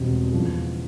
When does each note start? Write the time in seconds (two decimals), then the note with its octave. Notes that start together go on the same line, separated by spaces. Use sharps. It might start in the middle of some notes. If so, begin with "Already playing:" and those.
Already playing: E1 E2 B2 G3 C4
0.33 E2 C#3 F3